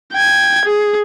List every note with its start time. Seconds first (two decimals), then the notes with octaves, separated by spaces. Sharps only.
0.12 G5 G#6
0.65 G#4